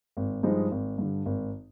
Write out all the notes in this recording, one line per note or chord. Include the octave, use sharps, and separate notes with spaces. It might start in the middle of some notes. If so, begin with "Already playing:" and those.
G#1
G2 F3 G#3 D#4
G#1
G2 D3
G#1